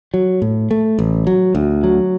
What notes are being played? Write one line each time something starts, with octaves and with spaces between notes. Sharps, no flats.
F#3
A2
A3
A1
F#3
D2
F#3